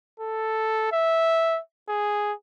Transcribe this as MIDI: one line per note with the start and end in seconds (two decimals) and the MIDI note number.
0.20 0.90 69
0.92 1.60 76
1.89 2.33 68